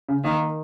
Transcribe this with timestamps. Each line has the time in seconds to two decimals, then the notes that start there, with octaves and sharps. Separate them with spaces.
0.09 C#3
0.24 D#3 A#3